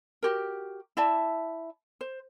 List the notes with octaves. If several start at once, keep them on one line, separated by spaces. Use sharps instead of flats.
F#4 G4 A#4
E4 D5 E5 A5
C5